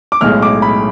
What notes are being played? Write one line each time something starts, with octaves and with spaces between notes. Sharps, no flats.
D6
B1 A2 G#3 F6
D6
B5